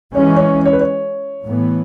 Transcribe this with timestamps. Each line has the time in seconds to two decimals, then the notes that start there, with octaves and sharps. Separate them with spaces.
0.15 E3 G#3 C#4 C#5
0.36 C#5
0.65 C#5
0.73 B4
0.81 C#5
1.45 A2 E3 B3